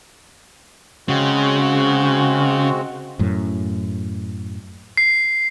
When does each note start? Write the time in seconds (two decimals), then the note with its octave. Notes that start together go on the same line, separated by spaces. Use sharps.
1.09 C#3 G#3 C4 F#4
3.19 F#2 A2
4.97 C7